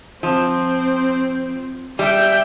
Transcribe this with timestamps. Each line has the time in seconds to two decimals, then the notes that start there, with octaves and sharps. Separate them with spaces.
0.23 F3 C4
1.99 G3 E5 G5